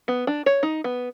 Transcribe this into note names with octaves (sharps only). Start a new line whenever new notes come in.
B3
D4
C#5
D#4
B3